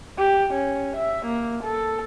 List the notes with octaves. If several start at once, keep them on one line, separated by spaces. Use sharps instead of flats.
G4
C#4
E5
A#3
A4